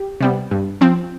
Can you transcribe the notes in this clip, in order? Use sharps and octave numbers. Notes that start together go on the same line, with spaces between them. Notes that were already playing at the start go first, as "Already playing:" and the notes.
Already playing: G4
C3 G3 B3
G2
F3 C4